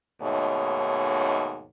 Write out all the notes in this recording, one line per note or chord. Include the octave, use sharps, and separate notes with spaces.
D#2 G#2 B2 A3 C#5